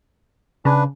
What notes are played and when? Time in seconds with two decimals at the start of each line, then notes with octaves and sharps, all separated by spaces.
0.65 C#3 D4 B4